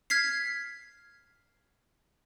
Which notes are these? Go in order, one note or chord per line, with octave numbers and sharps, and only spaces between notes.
F6 G#6 B6 C7